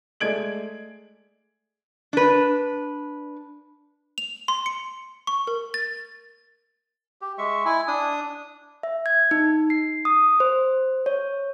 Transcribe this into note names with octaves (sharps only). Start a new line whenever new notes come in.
G#3 A3 D5 G#6 D7 F#7
D4 B4
F7
C6
C#7
C#6
A#4
A6
G4
G#3 E5 C#6
E4 G#5
D4 D#6
E5
G#6
D#4
C7
D#6
C5
C#5